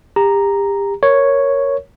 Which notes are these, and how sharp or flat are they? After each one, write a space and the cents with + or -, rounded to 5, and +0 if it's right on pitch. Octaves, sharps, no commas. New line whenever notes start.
G4 +30 A#5 +0
A#4 +0 C#5 +0